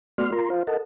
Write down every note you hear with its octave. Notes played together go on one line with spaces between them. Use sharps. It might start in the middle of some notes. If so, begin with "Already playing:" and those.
A3 B3 F#4 D5 C6 F6
F4 A#4 A#5 C6
F4 C5 F5
A4 A#4 D#5 F#5 A5